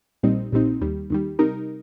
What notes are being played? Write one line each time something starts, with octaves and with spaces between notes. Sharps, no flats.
A#1 A#2 G3 C4 D#4
A#1 A#2 G3 C4 D#4
D#2 D#3 G3
D#2 D#3 G3
C3 G3 D#4 A#4